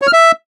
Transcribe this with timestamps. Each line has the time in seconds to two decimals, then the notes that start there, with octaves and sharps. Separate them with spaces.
0.02 C#5
0.07 F6
0.13 E5